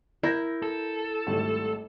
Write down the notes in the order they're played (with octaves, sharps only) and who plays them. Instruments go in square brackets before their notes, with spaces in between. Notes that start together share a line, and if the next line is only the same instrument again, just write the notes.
[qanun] E4 [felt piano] A#4 G6 A#6
[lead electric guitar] A4
[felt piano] G#1 G3 A3